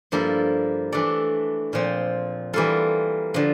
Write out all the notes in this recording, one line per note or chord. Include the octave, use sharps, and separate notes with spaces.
G2 F3 A#3 E4 A4
E3 A3 D4 A4 D5
A#2 F3 C4
E3 G3 A#3 F4 A4
D3 F3